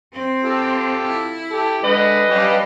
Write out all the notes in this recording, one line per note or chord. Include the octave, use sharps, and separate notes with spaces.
C4 C5
F4 G4 A4
E4
G4 A4
D3 G#3 B4 D#5 E5
G3 C#4 D4 G4 F5